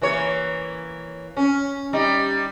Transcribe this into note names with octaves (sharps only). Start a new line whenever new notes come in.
E3 A#3 C#5
C#4
G3 D#4